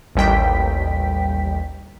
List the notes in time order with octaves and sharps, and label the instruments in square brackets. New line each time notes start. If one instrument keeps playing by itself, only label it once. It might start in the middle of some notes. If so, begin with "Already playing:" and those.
[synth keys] A1 D#2 G3 G5 B6